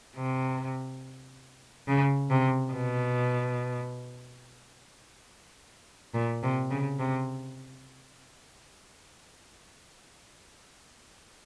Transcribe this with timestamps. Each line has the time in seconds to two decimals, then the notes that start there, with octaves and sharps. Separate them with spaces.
0.16 C3
1.88 C#3
2.30 C3
2.72 B2
6.14 A#2
6.43 C3
6.71 C#3
6.99 C3